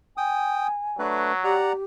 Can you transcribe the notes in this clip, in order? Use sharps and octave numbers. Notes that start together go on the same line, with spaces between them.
G5 G#5 D#6
F#3 A3 D4 B4
G4 D5 F#5 A#5